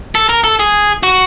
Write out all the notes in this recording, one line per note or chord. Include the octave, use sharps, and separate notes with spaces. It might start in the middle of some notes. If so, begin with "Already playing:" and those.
A4
A#4
A4
G#4
F#4